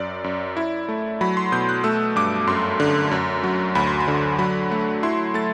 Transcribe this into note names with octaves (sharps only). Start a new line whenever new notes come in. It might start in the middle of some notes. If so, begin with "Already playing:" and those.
Already playing: F#2 D5
F#2
E4
A3
F#3 B5
C6
B2 G6
F#6
A3 E6
G2 D6
F#2 C6
D3
F#2
F#3
D2 B5
C6
B5
D3
F#3 B5
A3
E4 C6
A3 A6